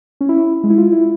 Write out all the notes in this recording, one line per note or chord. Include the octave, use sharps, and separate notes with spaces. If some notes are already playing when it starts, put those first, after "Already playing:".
C#4
E4
G#3
E4
F4
E4